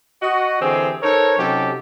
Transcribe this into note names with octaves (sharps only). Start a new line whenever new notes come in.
F#4 D#5
D3 E3 C4 G4 G#4
D#4 A4 A#4 C5 C#5
C3 F#3 C#4 D#4 G4 A4